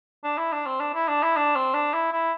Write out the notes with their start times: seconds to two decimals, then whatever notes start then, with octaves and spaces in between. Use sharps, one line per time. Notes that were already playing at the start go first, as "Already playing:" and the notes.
0.24 D4
0.38 E4
0.52 D4
0.66 C4
0.80 D4
0.94 E4
1.08 D4
1.23 E4
1.36 D4
1.56 C4
1.74 D4
1.93 E4
2.13 E4